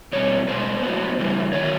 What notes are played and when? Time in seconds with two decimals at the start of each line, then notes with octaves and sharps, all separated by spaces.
0.13 B2 G3 C4 C#5
0.48 B2 G#3 B3 C5
0.83 A2 F#3 B3
1.19 C#3 E3 G3
1.53 D#3 F#3 B3 C#5